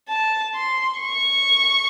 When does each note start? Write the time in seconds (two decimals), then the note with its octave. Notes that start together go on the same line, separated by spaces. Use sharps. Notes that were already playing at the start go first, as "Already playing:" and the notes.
0.09 A5
0.55 C6
1.00 C#6